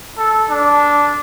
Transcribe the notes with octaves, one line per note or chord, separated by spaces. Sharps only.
A4
D4